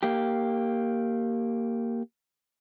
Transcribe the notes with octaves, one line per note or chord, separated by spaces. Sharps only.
A#3 G4